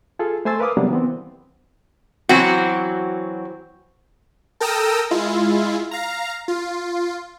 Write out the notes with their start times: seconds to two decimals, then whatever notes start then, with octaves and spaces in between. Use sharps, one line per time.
0.19 F4 G#4 A4
0.45 A3 C5 G#5 C6 E6 A6
0.59 A#4 B4 F5 D6 D#6
0.77 C3 F#3 G3 A#3 B3 D4
0.91 E3 B3 C4
2.29 E3 F#3 C4 F#4
4.60 A4 A#4 G5 A#5 D#6 E6
5.11 G#3 E4 F4
5.91 F5 A#5
6.48 F4